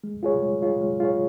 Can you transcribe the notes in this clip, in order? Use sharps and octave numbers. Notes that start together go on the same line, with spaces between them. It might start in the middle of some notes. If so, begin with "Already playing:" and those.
G#3
F4 G#4 C#5
G#3
F4 G#4 C#5
G#3
F4 G#4 C#5